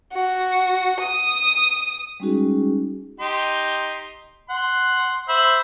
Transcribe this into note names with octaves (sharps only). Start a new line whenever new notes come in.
F#4
D#6
G3 G#3 C#4 D#4 F#4 G#4
D#4 G4 C6
F#5 C6
C5 E5 B5